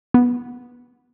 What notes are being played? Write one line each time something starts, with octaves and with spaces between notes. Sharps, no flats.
B3